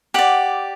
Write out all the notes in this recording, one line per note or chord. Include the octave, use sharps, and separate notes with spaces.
G4 D5 F#5